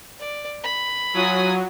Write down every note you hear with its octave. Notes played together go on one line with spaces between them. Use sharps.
D5
B5
F#3 F4 G#5 D#6